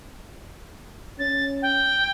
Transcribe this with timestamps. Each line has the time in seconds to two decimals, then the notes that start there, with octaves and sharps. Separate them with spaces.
1.19 C#4 A6
1.62 G5